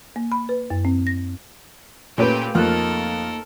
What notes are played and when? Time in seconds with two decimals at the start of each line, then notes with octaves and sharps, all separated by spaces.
0.16 A#3
0.32 B5
0.49 B4
0.70 F#2
0.85 C4
1.07 A#6
2.18 A#2 A3 C#4 G4 B4 G5
2.55 F2 A3 A#3 D#4 A4 A#4 F6 F#6